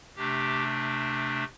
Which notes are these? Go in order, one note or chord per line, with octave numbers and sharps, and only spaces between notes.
C3 A3 D4 G4